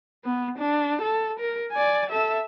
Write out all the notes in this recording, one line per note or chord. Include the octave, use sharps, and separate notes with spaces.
B3
D4
A4
A#4
D5 G#5
A4 E5